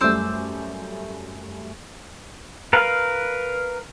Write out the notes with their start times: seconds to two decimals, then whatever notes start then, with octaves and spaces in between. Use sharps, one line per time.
0.01 F#2 G3 A3 C5 D6 E6
2.73 A#4 B4 F5